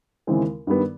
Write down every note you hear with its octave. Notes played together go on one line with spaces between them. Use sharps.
D#2 C#3 E3 G#3 C4
G2 D#3 G3 B3